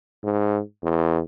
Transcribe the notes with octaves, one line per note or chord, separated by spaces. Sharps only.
G#2
E2